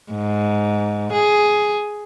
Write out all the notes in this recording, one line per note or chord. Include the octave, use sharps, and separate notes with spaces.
G#2
G#4